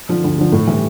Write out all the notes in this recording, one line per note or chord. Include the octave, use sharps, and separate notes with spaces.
D3 F3
D2
D3 F3
A2
E3 G3